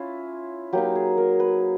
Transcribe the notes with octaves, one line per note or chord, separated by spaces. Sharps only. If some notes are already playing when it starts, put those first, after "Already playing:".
Already playing: C#4 E4 F4
F#3 A#3 D#4 G4
G#4
A#4
B4